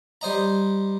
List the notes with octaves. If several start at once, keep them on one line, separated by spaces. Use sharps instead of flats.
G3 C5 D#5 A#5